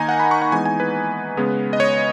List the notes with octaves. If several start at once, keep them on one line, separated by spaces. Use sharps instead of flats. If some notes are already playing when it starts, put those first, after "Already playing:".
Already playing: D#3 A#3 D#4 G#5 A#5
F#5
B5
C#6
F#5
E3 G#3 B3 D#4 G#5
G#5
B4
C#3 G#3 B3
D#5
C#5